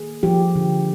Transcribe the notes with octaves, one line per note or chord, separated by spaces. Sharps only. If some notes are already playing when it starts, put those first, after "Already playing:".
Already playing: D#3 A#3 G#4
F3 G4
D3